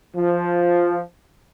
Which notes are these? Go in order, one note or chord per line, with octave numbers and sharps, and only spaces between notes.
F3